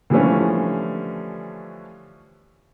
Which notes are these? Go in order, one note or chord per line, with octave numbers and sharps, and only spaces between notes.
D3 E3 F3 G3 A3 C#4